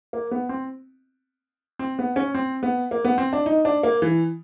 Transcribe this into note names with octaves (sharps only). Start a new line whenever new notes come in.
A#3
B3
C4
C4
B3
C#4
C4
B3
A#3
B3
C4
D4
D#4
D4
A#3
E3